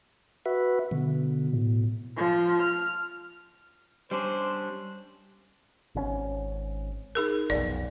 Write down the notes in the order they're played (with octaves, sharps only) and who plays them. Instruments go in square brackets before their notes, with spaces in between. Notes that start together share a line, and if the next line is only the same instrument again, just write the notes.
[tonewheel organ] F#4 B4 E5
[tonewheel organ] B2 [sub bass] D3
[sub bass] A2
[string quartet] F3
F6
[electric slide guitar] G3 C#4 D4 [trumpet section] C5
[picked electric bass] G#1 B2 C#4
[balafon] D#4 G#4 A#4
[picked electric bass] F1 B1 [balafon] D5